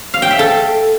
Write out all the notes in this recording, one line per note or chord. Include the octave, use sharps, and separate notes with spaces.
F5
G5
E5
A4